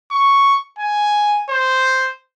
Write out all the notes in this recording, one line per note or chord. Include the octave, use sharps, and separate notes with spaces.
C#6
G#5
C5